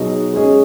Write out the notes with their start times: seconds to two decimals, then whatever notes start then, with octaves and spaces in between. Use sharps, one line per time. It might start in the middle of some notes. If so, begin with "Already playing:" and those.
Already playing: B2 F#3 D#4 G#4 D#5
0.33 G#3 C#4 G#4 D#5